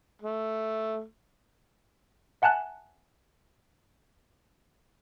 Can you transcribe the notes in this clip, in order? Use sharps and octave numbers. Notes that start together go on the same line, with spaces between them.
A3
E5 F#5 G#5 A5 F#6